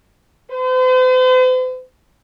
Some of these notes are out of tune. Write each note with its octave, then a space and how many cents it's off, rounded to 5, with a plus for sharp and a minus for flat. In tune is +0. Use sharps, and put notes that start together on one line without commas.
C5 -45